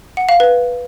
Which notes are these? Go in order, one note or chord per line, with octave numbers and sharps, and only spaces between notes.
F#5
F5
B4